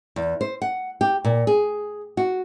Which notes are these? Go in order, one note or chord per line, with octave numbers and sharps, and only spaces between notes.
E2
C5
F#5
G4
A#2
G#4
F#4